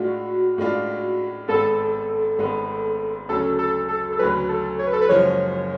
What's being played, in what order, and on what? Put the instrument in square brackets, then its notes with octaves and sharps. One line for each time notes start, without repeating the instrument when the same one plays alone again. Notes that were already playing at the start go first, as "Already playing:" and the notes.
Already playing: [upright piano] A2 G#3 D4 F4 [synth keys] F#4
[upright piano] A2 G#3 D4 F4
[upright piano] G#1 G#2 G#3 B3 [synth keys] A4
[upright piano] G#1 G#2 G#3 B3
[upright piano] D2 C#3 F#3 C#4 [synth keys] A4
[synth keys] A4
A4
A4
[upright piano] D2 C#3 F#3 C#4 [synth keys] B4
[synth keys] A4
C#5
B4
A4
B4
[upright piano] F#1 F#2 C#3 F3 G#3 [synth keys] C#5